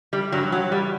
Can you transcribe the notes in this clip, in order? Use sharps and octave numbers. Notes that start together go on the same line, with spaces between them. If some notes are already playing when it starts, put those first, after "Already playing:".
G3
G2 E3 F#3
F#3
G3